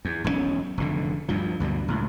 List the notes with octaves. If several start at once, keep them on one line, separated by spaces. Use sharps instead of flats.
E2
E1 B1 A#2 C#4
F1 A2 D3
D2 G2 F3
D2 G2 B2 F#3
C#2 A2